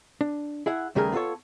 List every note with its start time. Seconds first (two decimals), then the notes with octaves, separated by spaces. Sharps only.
0.21 D4
0.66 E4 G#4 E5 F#5
0.95 D#2 C#3 G3 A3 G#4 A#4
1.12 B3 F4 G#4 A4 C#5